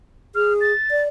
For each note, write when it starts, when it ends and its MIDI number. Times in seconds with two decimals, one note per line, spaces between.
0.35 0.73 68
0.35 0.54 89
0.61 1.01 93
0.91 1.08 74